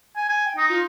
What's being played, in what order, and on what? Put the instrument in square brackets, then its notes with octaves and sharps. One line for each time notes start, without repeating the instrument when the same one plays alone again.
[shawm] G#5
G#5
[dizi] G5
[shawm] D#4 [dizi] D#6
[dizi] F4